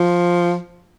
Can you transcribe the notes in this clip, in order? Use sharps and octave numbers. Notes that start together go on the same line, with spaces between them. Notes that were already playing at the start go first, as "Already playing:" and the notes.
Already playing: F3